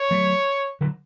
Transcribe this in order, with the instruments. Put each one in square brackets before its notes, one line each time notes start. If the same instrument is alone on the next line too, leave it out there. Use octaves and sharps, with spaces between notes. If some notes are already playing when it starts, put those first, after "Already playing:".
Already playing: [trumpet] C#5
[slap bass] F#3 A3
D3 F#3